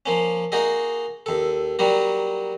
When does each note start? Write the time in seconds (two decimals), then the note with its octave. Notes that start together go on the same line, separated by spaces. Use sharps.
0.06 F3 A#3 C#4
0.52 A#3 D#4 F#4 G#4 D#5
1.26 D#2 A4
1.79 F#3 G3 A#3 F#4